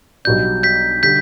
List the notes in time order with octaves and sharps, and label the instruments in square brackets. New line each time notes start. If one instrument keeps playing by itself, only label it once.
[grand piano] B1 B2 G3 D4 [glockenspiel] G6
[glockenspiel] G6 B6
[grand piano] D3 G3 [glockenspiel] G6 B6